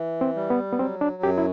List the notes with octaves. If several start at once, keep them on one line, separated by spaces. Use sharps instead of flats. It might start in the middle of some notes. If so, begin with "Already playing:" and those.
Already playing: E3
C4
G3
B3
B3
F#3 C4
D4
F#2 G4
E4